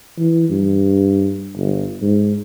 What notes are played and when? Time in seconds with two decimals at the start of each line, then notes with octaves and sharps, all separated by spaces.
0.19 E3
0.50 G2
1.57 G1
2.02 G#2